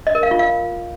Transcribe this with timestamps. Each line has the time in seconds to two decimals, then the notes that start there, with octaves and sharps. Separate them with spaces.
0.07 D#5
0.15 A#4
0.23 F5
0.31 F4
0.39 F5